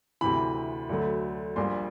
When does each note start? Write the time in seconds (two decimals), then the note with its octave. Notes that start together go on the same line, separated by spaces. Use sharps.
0.21 D2 C3 E3 B5
0.89 D2 D3 F#3 A3
1.56 A#1 A#2 G3 C6